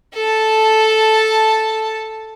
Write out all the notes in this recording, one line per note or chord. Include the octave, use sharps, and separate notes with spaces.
A4 A5